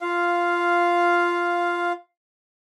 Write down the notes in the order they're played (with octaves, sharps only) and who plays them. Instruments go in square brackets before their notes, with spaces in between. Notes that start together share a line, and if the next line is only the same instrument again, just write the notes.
[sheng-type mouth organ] F4 F5